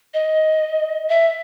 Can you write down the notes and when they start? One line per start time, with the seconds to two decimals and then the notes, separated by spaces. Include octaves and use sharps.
0.14 D#5
1.09 E5